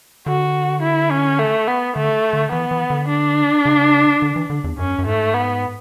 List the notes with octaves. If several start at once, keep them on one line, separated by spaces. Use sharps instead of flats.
D3 F#4
E4
C#4
A3
B3
D3 A3
D3
E3 B3
E3
D3
D4
C#3
D3
E3
D3
E2
F#2 C#4
F#2
G#2 A3
B3